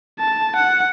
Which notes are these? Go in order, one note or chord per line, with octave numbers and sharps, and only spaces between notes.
A5
F#5